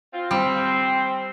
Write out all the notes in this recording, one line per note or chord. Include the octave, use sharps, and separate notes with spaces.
C4 F4
G3 C4